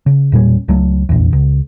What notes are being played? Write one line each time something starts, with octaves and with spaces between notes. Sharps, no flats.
C#3
E1 A#2 G3 C#4
C#2 F#3 A3
F1 A#1 E2
C#2